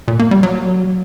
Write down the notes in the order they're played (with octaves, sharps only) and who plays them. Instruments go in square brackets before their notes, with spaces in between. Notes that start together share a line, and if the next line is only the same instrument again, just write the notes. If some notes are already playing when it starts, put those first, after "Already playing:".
[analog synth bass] A#2
A#3
G3
F#3